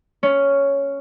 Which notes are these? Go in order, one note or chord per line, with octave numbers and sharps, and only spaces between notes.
C#4